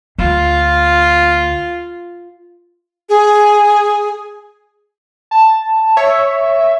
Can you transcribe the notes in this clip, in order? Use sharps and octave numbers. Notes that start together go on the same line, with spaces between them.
D2 F4
G#4
A5
C#5 E5